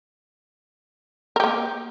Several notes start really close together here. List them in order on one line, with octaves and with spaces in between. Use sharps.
A#4 G4 A#3